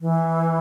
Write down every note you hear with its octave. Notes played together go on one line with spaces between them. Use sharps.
E3